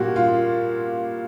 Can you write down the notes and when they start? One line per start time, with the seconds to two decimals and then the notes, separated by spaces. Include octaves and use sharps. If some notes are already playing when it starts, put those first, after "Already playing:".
Already playing: A#2 G3 A#3 F#4 G4
0.16 F4